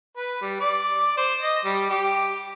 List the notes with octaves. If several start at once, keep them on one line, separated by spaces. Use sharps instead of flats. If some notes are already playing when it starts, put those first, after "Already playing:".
B4
G3
D5
C5
D#5
G3
G4